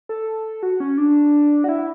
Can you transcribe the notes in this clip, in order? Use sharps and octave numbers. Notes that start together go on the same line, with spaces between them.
A4
F#4
C#4
D4
F#4
E4